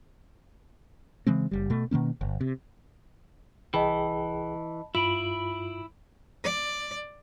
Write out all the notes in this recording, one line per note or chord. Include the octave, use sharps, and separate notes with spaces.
C#3 E3 G#3 C4
F#1 G3
B2 A3
B2 D#3 A#3 C#4
G1
C3
C2 E3 G#4 D#5 G5 A5 B5
G2 E4 F4 B5 D7 F#7
D5